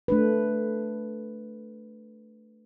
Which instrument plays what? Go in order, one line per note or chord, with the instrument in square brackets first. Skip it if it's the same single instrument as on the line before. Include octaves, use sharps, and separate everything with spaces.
[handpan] A3 D4 B4